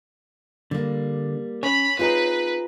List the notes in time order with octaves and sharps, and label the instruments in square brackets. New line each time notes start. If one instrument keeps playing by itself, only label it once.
[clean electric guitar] D3 [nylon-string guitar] G3 A#3
[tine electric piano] C#4 G#5 [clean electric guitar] C#5 [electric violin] B5
[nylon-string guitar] C4 D#4 G#4 [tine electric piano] F4 A#5 [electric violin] B4